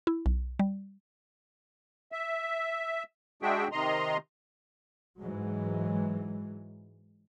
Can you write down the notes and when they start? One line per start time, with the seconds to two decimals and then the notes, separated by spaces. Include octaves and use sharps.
0.07 E4
0.26 B1
0.59 G3
2.12 E5
3.42 G#3 D4 F#4 G#4 E5 G5
3.72 C3 D#3 D#5 A#5 C6
5.19 G#2 E3 F#3 G#3